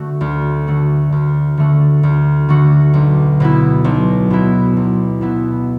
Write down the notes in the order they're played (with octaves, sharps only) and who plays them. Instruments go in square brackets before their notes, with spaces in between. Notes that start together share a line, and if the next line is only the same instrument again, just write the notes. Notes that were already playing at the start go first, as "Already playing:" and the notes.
Already playing: [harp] D3 A3 F#4
D2
D3 A3 F#4
D2
D3 A3 F#4
D2
D3 A3 F#4
B1
B2 B3 E4
B1
B2 B3 E4
B1
B2 B3 E4